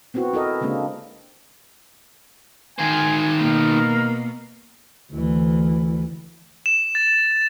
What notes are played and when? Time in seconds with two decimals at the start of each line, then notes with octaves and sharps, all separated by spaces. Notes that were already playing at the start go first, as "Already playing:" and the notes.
0.14 B3 C4 E4 F#4
0.33 E4 A4 A#4 D#5
0.61 C#3 G#3 A#3 C4 D4
2.79 D#3 C5 G#5
3.38 B2 A#3 A#4
5.13 D2 E3
6.66 E7
6.95 A6